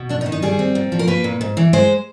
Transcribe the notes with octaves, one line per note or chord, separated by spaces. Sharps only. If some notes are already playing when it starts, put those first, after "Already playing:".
Already playing: B2
F#2 D4
D#4
D#3
D#4
G3 G#4
C4
A#2
F3
A#4
A#3 B4
A#2
G#2
E3
G#3 C5